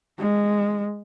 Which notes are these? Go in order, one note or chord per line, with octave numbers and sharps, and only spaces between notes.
G#3